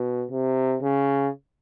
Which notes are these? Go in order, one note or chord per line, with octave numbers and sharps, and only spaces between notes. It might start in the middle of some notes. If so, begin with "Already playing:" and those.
Already playing: B2
C3
C#3